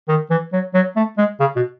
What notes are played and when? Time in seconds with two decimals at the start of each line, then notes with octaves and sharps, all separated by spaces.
0.08 D#3
0.30 E3
0.53 F#3
0.74 F#3
0.96 A3
1.18 G#3
1.40 C#3
1.56 B2